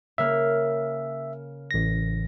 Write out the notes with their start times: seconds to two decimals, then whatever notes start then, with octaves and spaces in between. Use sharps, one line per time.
0.18 C#3 A#3 E5 F6
1.71 A1 A#6